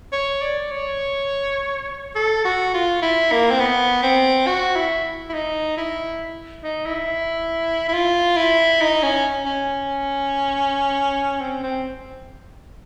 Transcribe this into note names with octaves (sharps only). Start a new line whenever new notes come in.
C#5
D5
C#5
A4
F#4
F4
E4
A#3
C4
B3
C4
F#4
E4
E4
D#4
E4
D#4
E4
E4
F4
E4
D#4
C#4
C#4
C4
C4